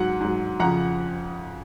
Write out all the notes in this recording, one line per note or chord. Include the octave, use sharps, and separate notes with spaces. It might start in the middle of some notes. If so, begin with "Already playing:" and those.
Already playing: G#2 F#3 F#5
G#2 F#3
F2 C#3 F3 F#5 A#5